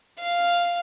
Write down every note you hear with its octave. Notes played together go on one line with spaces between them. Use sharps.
F5